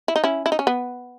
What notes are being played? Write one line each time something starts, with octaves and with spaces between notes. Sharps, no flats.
E4
D#4
C#4 E4
E4
D#4
C#4
B3